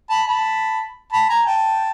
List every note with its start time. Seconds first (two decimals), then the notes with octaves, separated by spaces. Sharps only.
0.10 A5 B5
0.27 A5 B5
1.12 A5 B5
1.29 G#5 A#5
1.46 G5 A5